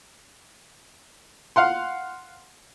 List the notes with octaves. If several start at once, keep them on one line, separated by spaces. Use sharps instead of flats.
F5 F#5 C6